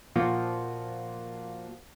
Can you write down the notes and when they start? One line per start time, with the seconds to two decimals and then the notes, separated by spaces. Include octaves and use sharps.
0.16 A#2 F3 A#3 F4 F#4